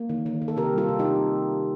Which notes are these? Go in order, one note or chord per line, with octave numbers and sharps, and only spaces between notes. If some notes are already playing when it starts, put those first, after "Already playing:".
Already playing: A#3
D#3
D#3
D#3
A4
C3 G4 A#4
G3 F4 A4
C3
D#4 G4